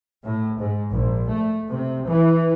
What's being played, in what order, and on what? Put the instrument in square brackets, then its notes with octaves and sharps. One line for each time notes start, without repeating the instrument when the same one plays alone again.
[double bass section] A2
G#2
A#1
A3
C3
E3